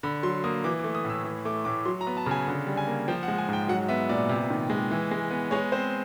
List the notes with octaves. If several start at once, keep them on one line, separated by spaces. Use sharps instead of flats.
D3 B5
F#3 C6
A#3 D#6
E3 D6
D6
A3
D#6
A2
E6
E3
A3 D6
A2 D6
F#3 C6
A#5
B3
A5
C#3 G#5
D3
G3
G#5
A#3
F3 G5
F#5
G#3
G#5
G#2 G5
F#3 F#5
B3 E5
A#2 D5
C3
D#3
G#3
E3
G#3
B3
G#3 C#5
C4 C5